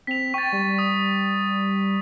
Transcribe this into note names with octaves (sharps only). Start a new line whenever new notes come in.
C4 B6 F7
G5 C#6 A6
G3
D#6